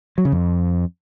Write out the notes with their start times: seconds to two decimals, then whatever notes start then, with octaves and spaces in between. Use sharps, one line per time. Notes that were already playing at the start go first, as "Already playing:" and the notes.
0.18 F#3
0.25 C#3
0.32 F2